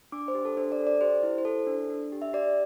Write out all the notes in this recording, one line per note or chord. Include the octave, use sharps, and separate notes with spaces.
D4 D6
C5
G4
A4
D4 C5
D5
A4
D5
G4 C5
E4
C5
A4
D4
D4
G4
E5
G4 D5